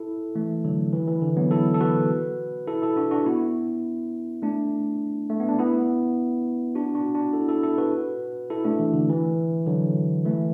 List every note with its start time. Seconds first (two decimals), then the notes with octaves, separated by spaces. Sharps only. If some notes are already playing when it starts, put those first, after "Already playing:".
Already playing: E4 A4
0.35 E3 A3
0.65 D3 F#3
0.93 E3
1.07 E3
1.22 D3
1.37 F#3 B3
1.51 E4 A4
1.74 A4
1.81 F#4 B4
2.67 E4 A4
2.82 E4 A4
2.96 D4 F#4
3.11 D4 F#4
3.26 B3 E4
4.42 A3 D4
5.30 A3
5.40 B3
5.49 D4
5.59 B3 E4
6.75 D4 F#4
6.95 D4 F#4
7.15 D4 F#4
7.33 E4 A4
7.48 E4 A4
7.63 E4 A4
7.78 F#4 B4
8.50 E4 A4
8.65 A3 D4
8.79 E3
8.94 D3
9.09 E3
9.67 D3 F#3
10.25 E3 A3